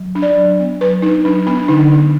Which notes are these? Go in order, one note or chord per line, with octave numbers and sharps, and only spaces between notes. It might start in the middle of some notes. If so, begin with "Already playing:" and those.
Already playing: F#3
D4
D5
F#3
B3
F#3 B4
D4 D#4
F#3 D4
B3 D4
D3 D#4
D4